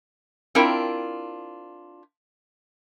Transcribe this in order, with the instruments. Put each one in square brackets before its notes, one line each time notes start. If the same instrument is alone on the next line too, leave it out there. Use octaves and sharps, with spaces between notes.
[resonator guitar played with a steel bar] C4 D4 E4 F4 A#4 G5